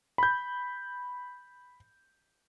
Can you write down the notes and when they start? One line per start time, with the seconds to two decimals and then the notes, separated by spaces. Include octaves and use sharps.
0.18 B5 G6